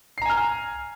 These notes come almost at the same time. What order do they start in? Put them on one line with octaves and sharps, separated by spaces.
C7 A#5 G#5 F6